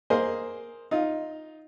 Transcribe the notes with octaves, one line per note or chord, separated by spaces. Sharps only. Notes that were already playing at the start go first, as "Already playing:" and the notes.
A#3 G#4 C5 D#5
D#4 F4